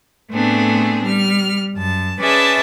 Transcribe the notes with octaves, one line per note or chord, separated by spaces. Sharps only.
A2 A3 B3 C4 D4 G#4
G3 F6
F#2 A5
C#4 G#4 B4 D5 E5 A5